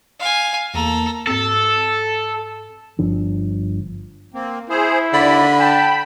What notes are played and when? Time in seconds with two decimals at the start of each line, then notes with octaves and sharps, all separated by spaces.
0.19 F5 G#5
0.74 E2 A#3 A4 A#5
1.27 G#2 C4 A4
2.99 G1 F3 D4
4.34 A#3 C4
4.70 E4 G#4 C5
5.13 D#2 D3 D5 B5
5.60 G5 A5